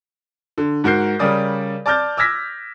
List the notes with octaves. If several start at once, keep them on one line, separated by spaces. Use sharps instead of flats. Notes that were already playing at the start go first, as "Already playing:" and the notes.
D3
G#2 F#4 A#4 G6 C7
C#3 G3 A#4 D5 D#6
D5 A5 D6 F6 G6 A6
D6 E6 F6 G#6 A#6 B6